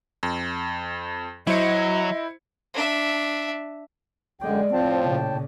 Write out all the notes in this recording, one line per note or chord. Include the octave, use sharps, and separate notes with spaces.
F2
F#3 E4 C5 D#5 C#7
D4 E5
F#2 D3 G#3 D5 G5
A2 F3 C4 G5 A5
A#2 C#3